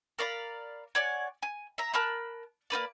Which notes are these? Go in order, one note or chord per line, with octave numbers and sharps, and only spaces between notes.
A#4 D5 F5 B5
C#5 D5 F#5 G#5
G#5
E5 A#5
A#4 A5 B5 F#6
A#3 D#4 B4 D5